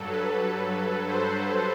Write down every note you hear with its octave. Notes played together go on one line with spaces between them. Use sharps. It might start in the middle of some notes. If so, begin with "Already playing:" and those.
Already playing: G2 F#3 A4
B4
C5